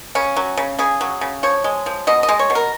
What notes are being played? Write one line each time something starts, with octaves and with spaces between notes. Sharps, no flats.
C#3 C#4
F#3
C#3
C#3 G#4
F#3
C#3
F3 C#5
G#3
F3
B2 D#5
D#5
G#3
C#5
B2
A#4